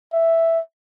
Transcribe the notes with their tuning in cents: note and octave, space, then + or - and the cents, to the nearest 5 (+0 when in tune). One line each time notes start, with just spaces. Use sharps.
E5 +0